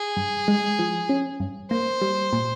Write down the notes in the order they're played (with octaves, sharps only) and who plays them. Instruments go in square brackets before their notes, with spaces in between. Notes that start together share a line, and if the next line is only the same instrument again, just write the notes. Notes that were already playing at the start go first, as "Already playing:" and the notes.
Already playing: [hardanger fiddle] G#4
[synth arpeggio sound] G2
G#3
F3
C#4
G2
[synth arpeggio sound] A#3 [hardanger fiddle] C5
[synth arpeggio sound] G3
A#2